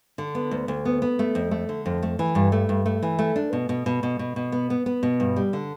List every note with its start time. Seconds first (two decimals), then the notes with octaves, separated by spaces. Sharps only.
0.18 D3
0.35 B3
0.51 D2
0.68 D2
0.85 B3
1.02 B3
1.19 A3
1.35 F2
1.51 A3
1.69 D3
1.86 F2
2.03 A3
2.19 E3
2.35 G2
2.52 A3
2.69 G2
2.86 A3
3.03 E3
3.19 A3
3.36 D4
3.53 B2
3.69 B2
3.86 B2
4.03 B2
4.19 B2
4.36 B2
4.52 B3
4.70 B3
4.86 B3
5.03 B2
5.20 G2
5.36 G3
5.53 D3